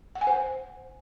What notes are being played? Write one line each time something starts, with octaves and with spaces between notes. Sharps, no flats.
F#5
G#5
C5